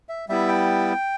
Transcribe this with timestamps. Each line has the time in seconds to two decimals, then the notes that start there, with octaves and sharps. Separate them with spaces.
0.09 E5
0.28 G3 B3 E4 E5
0.48 G5